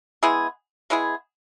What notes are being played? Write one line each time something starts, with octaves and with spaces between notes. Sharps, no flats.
G#3 B3 E4 G#4
G#3 B3 E4 G#4